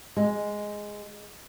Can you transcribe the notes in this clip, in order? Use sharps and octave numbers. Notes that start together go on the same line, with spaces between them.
G#3